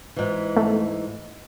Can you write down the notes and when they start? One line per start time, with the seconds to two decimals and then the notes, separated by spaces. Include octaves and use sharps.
0.16 G#2 E3
0.57 A3